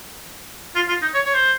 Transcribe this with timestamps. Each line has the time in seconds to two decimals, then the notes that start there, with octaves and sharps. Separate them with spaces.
0.75 F4
0.88 F4
1.02 D#4
1.14 C#5
1.26 C#5
1.34 C5